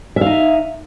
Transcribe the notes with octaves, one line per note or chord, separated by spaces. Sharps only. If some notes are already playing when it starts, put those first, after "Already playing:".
D#4 E5 F5